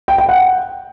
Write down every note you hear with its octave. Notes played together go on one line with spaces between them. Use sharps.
G5
G5
F#5